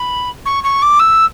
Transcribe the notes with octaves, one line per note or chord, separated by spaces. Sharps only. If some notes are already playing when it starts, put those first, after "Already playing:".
Already playing: B5
C#6
C#6
D6
E6